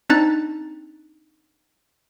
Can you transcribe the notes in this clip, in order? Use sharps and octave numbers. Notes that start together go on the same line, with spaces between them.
C4 D4 D#4 A#5 F#6 A6